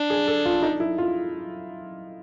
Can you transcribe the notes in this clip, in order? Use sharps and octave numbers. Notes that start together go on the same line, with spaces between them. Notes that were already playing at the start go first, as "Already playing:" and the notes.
Already playing: D4
G#4
A4
F4
D#4
E4
F4